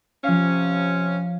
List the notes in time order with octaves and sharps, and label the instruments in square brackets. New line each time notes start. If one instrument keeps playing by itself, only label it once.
[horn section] C3 C#4 [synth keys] F3 F5